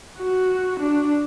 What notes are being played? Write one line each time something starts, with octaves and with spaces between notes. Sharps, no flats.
F#4
D4